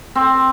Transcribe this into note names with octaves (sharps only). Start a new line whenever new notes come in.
C4